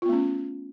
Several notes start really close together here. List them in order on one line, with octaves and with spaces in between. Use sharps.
F4 B3 A3 C#4